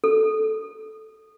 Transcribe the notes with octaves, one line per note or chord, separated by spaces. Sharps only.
A4